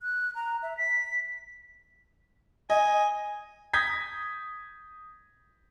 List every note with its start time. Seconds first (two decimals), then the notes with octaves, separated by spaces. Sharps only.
0.02 F#6
0.35 A#5
0.63 E5
0.77 B6
2.70 D#5 G#5
3.73 D#6 G6 G#6 A#6 B6